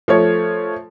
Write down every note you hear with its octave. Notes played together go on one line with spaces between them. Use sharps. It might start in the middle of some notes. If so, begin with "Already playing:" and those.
F3 A3 C#5